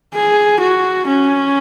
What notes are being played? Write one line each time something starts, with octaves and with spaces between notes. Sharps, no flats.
G#4
F#4
C#4